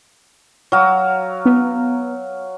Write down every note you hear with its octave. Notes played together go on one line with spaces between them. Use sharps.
F#3 F5
B3